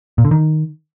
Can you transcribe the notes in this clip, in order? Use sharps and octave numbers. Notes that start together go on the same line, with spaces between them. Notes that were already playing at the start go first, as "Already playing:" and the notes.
A#2
D3
D#3